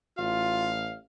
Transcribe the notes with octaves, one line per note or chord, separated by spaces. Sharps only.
A1 F4 F5